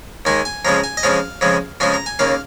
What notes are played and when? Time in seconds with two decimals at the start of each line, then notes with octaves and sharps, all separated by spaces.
0.25 D#2 D#3 G#3 G#5
0.45 G#5
0.65 F2 C#3 F3 G#3 A#5
0.84 G#5
0.97 D#5
1.03 F2 C#3 F3 G#3 F5
1.41 F2 C#3 F3 G#3
1.80 F2 C#3 F3 G#3 G#5
1.94 A#5
2.06 G#5
2.19 D#2 C#3 A#3 F5